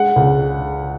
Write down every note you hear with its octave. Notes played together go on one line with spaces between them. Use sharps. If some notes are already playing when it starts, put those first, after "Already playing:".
Already playing: G#3 F#5
C#2